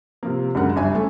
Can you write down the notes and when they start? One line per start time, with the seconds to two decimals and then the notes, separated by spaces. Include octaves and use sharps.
0.23 C3 F3 A#3
0.55 C#2 F#2 D3 A#4 F#5
0.76 G1 E5 G#5
0.95 A3 C#4